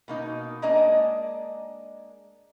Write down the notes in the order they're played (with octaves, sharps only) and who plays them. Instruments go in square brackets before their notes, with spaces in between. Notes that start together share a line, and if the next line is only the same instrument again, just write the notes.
[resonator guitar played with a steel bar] B2 A#3 D#4
G#3 A#3 D4 D5 D#5